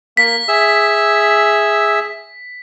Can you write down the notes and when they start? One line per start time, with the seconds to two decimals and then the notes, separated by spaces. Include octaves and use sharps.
0.17 A#3 B6
0.48 G#4 E5 E6